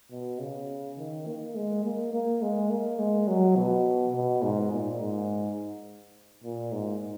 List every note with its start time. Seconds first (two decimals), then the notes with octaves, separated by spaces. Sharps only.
0.11 B2
0.41 C#3
0.99 D#3
1.27 A#3
1.56 G#3
1.85 A#3
2.13 A#3
2.42 G#3
2.71 A#3
2.99 G#3
3.29 F#3
3.57 B2
4.14 B2
4.43 G#2
4.72 A#2
5.00 G#2
6.44 A#2
6.72 G#2